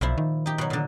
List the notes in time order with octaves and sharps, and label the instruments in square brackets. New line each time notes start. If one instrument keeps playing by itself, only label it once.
[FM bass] B1 [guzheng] A#2 F3 E4
[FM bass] D#3
[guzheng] D#4 G4
B2 F#3
A#2 D3